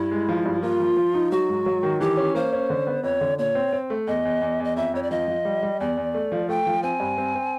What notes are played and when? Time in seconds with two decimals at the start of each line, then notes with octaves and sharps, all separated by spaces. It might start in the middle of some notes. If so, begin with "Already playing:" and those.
Already playing: G2 E4
0.11 G#3
0.29 F3
0.45 G2
0.62 A#3 F4
0.80 F3
0.97 F3
1.14 D#4
1.31 F#3 F#4
1.49 G#2
1.66 F#3
1.83 D#3
2.01 E3 G4
2.17 C#4
2.35 A#3 C5
2.53 C#4
2.70 D3
2.87 B3
3.03 F2 C#5
3.21 D3
3.39 A#2 C#5
3.55 C4
3.73 C4
3.90 A3
4.07 E2 D#5
4.25 E2
4.41 E2
4.60 E2 D#5
4.76 F2 E5
4.94 F2 C#5
5.03 D5
5.11 F3 D#5
5.28 F3
5.45 G3
5.63 G3
5.80 E2 D5
5.97 E2
6.14 A3
6.32 F3
6.49 A3 G5
6.66 F3
6.83 C4 G#5
7.00 G2
7.18 C4
7.35 C4